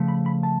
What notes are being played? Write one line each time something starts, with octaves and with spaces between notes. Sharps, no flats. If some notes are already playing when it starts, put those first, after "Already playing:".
Already playing: C#3 F3 A3
B5
B5
A5